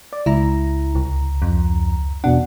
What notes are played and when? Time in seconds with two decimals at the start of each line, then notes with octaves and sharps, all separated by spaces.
0.13 D5
0.26 C#2 E4 A#5
0.95 C2
1.42 F2
2.24 E2 B2 D4 F#5